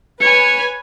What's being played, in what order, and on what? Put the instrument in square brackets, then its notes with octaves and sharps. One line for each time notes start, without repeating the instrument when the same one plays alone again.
[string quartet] B4 B5 [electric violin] C#5 G#5 [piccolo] C#7